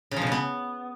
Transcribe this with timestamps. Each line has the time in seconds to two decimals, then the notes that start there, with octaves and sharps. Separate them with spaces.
0.11 C#3
0.16 F3
0.22 B2
0.27 C#3
0.32 B3